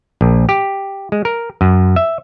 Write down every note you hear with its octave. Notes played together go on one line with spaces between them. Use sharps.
A#1
G4
G#3
A#4
F#2
E5